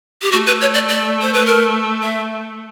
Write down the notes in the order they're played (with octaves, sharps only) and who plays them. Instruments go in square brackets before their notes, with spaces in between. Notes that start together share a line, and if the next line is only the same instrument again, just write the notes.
[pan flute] G4
[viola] A3 [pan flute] F#4
[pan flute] B4
C#5
D5
D5
C5
B4
A#4
E5